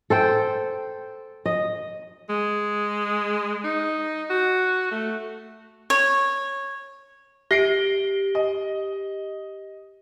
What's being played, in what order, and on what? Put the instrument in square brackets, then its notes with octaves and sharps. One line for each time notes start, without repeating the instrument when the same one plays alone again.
[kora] A4 C5 G5
D#5
[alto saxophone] G#3
D#4
F#4
A3
[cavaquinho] C#5
[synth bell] G4 G7 [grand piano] A#6 C7 D7
[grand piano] D#5